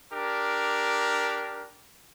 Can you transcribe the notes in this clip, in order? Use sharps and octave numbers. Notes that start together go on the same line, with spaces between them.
D4 G4 A#4